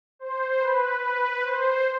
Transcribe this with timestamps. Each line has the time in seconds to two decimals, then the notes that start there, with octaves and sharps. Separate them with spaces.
0.19 C5
0.60 B4
1.01 B4
1.42 C5